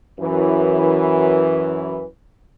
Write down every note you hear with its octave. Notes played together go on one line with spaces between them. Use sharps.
F#2 E3